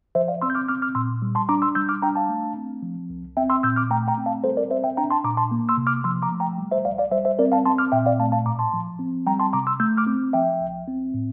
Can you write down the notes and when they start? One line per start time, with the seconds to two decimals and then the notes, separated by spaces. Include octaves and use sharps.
0.15 F3 C5 E5
0.28 D5 F5
0.42 C4 C6 E6
0.50 G6
0.55 D6 F6
0.68 C4 D6 F6
0.82 D6 F6
0.95 A#2 C6 E6
1.22 G3
1.35 A5 C6
1.49 D4 A#5 D6
1.62 C6 E6
1.75 G3 E6 G6
1.89 D6 F6
2.02 D4 G5 A#5
2.16 F5 A5
2.29 A3
2.57 C4
2.83 F3
3.10 C2
3.37 C4 E5 G5
3.50 C6 E6
3.63 A#2 E6 G6
3.76 D6 F6
3.90 A3 G5 A#5
4.08 G5 A#5
4.18 C4
4.26 F5 A5
4.44 G3 A4 C5
4.57 A#4 D5
4.71 C4 C5 E5
4.84 E5 G5
4.97 D4 G5 A#5
5.11 A5 C6
5.24 A#2 A#5 D6
5.37 A5 C6
5.51 A#3
5.69 C6 E6
5.77 C3
5.87 D6 F6
6.04 F3 C6 E6
6.22 A#5 D6
6.32 A3
6.40 G5 A#5
6.58 G3
6.71 C5 E5
6.85 C2 D5 F5
6.98 D5 F5
7.11 G3 C5 E5
7.25 C5 E5
7.39 C4 A#4 D5
7.52 F5 A5
7.65 C4 A5 C6
7.78 D6 F6
7.92 A#2 E5 G5
8.06 D5 F5
8.19 A3 F5 A5
8.32 F5 A5
8.46 A2 A#5 D6
8.59 A5 C6
8.73 F3
8.99 C4
9.27 G3 G5 A#5
9.40 A5 C6
9.53 C3 A#5 D6
9.67 C6 E6
9.80 A3 E6 G6
9.97 D6 F6
10.07 C4
10.33 F3 E5 G5
10.60 C2
10.88 C4
11.14 A2